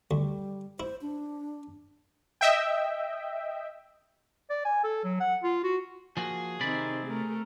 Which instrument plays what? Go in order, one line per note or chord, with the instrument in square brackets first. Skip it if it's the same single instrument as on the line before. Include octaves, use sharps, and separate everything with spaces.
[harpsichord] D2 [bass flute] G3
[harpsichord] E4 [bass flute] C5
[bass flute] D4
[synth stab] D#5 E5 G5
[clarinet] D5
G#5
A4
F#3
F#5
F4
F#4
[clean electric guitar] F3 A#3 F#4 [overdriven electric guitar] G#4
[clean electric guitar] C3 D5 B5 [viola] D#3 C4
[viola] A3 A#4